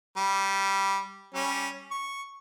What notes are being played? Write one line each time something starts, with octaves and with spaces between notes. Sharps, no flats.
G3
G3 C#4
C#6